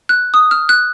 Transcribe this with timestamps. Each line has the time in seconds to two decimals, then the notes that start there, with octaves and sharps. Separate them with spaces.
0.09 F#6
0.34 D#6
0.51 F6
0.69 F#6